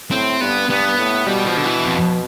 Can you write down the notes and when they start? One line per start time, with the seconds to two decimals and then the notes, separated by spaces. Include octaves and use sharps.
0.11 A2 C4
0.40 G2 B3
0.69 G2 B3
0.97 A2
1.26 B2 G3
1.46 F3
1.57 D3
1.65 E3
1.85 F2